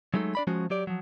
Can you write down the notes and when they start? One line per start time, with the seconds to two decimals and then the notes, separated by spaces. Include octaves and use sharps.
0.14 F#3 G#3 A3 D#4 A4
0.35 D4 D5 B5
0.47 F3 G#3 C#4 F#4
0.70 F#3 G4 D5
0.87 F3 F#3